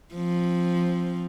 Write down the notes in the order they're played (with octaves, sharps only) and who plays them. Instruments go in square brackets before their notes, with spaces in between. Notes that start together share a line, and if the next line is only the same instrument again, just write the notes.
[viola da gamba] F3 C4